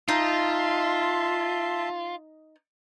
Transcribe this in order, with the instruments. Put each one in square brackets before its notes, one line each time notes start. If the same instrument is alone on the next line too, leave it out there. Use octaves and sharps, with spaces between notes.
[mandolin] D#4 [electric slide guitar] F4 [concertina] E5 A5 C6